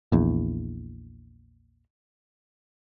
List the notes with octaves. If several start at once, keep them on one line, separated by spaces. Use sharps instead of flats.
A#1 E2